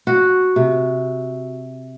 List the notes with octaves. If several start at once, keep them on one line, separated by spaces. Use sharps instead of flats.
F#4
C3